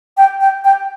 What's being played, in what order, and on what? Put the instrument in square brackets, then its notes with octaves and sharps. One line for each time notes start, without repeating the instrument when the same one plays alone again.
[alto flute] G5
G5
G5